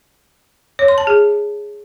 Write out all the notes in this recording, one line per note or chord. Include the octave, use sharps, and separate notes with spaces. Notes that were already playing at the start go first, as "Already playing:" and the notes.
C#5
C6
A5
G#4